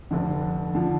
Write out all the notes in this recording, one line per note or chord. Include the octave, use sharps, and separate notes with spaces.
F1 F2 D3
D3 F3